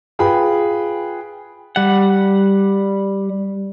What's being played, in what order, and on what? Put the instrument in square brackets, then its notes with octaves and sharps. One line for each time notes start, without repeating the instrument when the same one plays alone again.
[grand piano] F4 G#4 B4 G5 B5
[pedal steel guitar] G3 F#5